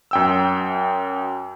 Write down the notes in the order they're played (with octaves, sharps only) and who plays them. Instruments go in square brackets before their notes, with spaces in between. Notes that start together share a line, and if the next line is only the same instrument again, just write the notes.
[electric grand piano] F#2 G5 E6